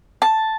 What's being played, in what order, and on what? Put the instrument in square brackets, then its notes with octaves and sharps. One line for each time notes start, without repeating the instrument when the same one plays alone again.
[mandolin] A5